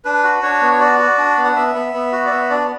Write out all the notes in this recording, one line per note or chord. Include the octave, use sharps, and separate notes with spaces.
D4 B4
F#4
D4 C#5
B3
C#5
F#4 D5
F#4
D4
B3
F#5
B3 E5
B3
B3
F#4
D5
B3 E5
D4 D5